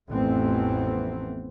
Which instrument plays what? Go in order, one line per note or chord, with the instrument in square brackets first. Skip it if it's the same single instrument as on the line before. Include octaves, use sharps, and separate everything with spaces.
[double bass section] A1 F2 E3 A3 B3 C4